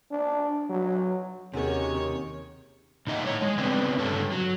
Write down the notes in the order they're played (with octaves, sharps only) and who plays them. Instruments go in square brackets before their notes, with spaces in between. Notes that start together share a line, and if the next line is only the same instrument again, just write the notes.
[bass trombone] D4
F#3
[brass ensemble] D#2 [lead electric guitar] C3 [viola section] D#3 C#5 [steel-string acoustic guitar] C#4 F#4 G#4
[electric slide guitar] A#2 D#4 D#5 E5 F#5
A2 C#5
G#3
C#3 B3 C4 D4
G2 D3 A4 C#5
F#3